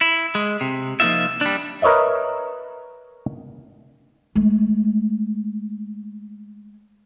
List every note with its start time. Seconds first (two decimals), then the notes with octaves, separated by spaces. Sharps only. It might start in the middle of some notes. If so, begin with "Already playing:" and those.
0.01 E4
0.35 G#3
0.61 C3
1.00 F3 A#3 C4 D#4 F4 E5
1.41 G3 D4
1.82 A#4 B4 C#5 D#5 E5
4.35 G#3 A3